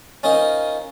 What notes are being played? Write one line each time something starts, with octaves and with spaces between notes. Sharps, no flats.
C#4 D#4 F4 A#4 C5 D#5